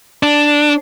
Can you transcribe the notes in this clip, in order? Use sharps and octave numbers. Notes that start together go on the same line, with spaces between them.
D4